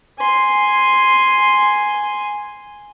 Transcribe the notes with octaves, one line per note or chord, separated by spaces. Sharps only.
G#5 C6